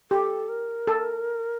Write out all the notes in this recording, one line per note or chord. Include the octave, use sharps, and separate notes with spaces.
G4 A4
A#4
A4